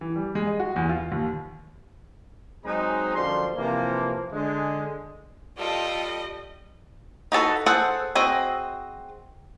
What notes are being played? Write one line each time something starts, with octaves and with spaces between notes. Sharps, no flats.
E3
G3
G#3
D#5
F#4
E2
F4
D#2
F#3 G#3 C4 D#4 G#4 A#5
F#2 D3 F3 G3 C6
C3 E3 F3 A#3
D3 G#3
G3 F4 A4 D#5 G5
D#4 F#4 A4 B4
G#4 A4 C5 F#5
C4 F#4 G#4 D#5